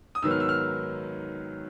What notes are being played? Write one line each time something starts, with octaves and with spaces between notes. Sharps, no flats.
D#6
G#2 D#3 F#3 B3 E6
F6
E6
F6